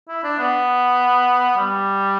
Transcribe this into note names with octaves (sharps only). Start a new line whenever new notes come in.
E4
D4
B3
G3